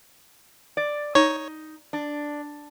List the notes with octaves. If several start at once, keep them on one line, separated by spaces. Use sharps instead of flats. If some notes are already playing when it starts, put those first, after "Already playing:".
D5
D#4 C#5
D4